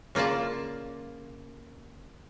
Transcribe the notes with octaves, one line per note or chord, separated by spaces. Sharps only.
C#3 A#3 F4 D5 A5